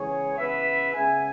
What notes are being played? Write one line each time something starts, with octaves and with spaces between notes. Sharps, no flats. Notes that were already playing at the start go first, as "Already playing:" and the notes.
Already playing: C#3 E3 G#3 B3 G#4 C#5
C#3 E3 B3 B4 E5
C#3 G#3 B3 E5 G#5